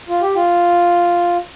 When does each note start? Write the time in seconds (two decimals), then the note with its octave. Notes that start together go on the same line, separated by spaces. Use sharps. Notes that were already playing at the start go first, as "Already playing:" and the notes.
0.09 F4
0.22 G4
0.36 F4